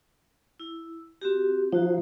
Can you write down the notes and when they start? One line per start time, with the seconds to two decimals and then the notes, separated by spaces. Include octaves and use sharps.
0.60 E4
1.22 C4 F#4 G4
1.72 F3 D#4 F#4 A#5